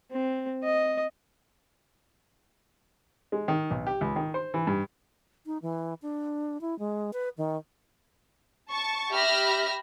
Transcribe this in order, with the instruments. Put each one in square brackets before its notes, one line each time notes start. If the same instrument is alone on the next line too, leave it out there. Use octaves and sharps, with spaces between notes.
[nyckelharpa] C4
D#5
[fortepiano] G#3
D#3
B1
G4
C#2
D#3
C5
E3
G2
[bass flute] D#4
E3
D4
E4
G#3
B4
D#3
[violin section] A5 C#6
G4 E5 B5 F6 A#6